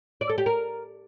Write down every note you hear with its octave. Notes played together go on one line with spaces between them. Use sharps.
D5
A4
G4
A#4